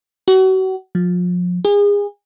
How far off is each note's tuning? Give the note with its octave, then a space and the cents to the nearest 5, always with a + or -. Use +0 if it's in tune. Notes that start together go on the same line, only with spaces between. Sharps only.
F#4 +35
F3 +35
G#4 -30